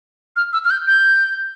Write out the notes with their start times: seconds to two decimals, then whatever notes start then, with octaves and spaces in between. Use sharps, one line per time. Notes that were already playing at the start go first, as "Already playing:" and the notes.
0.36 F6
0.53 E6
0.65 F6
0.70 G6
0.87 G6